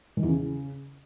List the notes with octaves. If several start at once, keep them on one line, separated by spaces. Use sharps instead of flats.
D#3
E2
C#3